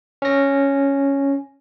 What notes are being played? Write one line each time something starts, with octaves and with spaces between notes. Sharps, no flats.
C#4 A#6